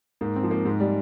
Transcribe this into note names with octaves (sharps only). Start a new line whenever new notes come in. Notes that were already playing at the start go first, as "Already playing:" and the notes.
G#2 A#3
C4
F3
A#3
G#2 G#3
G3